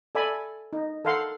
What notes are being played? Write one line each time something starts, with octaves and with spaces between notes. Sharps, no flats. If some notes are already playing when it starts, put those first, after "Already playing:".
A4 D5 E5 G#5 B5
D#4
A4 A#4 F5 F#5 C6